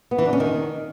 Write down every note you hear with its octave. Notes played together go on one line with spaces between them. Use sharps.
B3
E3
D4
C#4
D#3